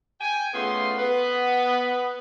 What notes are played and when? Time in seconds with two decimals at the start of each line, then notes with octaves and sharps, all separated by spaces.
0.21 G5 G#5
0.53 C#3 A3 B3 F4 C6
0.98 B3 B4